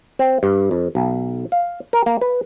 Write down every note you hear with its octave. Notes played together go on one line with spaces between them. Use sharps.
C4
G2
F2
B1
F5
A#4
A#3
B4